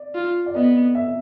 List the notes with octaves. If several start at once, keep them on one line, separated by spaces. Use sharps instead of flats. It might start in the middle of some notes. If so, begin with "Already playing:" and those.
Already playing: D5
F4
D5
B3 D#5
E5